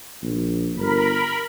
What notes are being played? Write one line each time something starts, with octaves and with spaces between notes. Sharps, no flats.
A#1
G1 A#4 B5